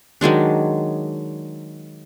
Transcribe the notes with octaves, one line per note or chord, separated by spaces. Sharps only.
D#3 F#3 G#3 D4